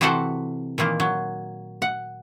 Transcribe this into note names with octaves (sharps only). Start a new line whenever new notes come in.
C3 E3 E4 F#4 A4 C5
A#2 D#3 E3 A#3
F#3
F#5